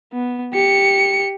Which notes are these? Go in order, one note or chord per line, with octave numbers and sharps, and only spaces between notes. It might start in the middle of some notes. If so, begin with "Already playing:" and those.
B3
G4 C#7